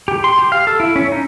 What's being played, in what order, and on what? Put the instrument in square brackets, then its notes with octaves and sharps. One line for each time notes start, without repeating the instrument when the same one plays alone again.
[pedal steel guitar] G4
C6
G4
F5
A4
E4
C#4
D#4